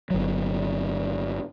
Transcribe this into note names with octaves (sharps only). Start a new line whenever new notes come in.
G1 F#3